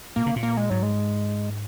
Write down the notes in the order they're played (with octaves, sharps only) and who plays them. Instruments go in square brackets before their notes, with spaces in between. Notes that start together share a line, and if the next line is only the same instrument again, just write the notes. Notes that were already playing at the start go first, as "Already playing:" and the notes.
[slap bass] A#2 [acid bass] A#3
[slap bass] C#3
A#2
[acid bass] A#3
G#3
[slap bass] G#2 [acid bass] F#3
[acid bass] G#3